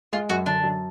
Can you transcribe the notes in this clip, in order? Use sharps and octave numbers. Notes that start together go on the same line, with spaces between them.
G#3 F4
F#2 F#4
D3 D4
F#2